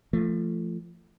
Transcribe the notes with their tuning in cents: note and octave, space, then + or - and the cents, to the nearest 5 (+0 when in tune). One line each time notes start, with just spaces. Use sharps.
F3 -25 A3 +10